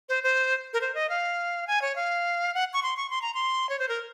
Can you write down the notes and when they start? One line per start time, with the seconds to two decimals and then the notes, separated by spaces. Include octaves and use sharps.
0.09 C5
0.23 C5
0.73 A#4
0.81 C5
0.95 D#5
1.10 F5
1.67 G#5
1.82 C#5
1.96 F5
2.54 F#5
2.73 C#6
2.83 C6
2.97 C#6
3.10 C6
3.22 A#5
3.34 C6
3.69 C#5
3.79 C5
3.89 A#4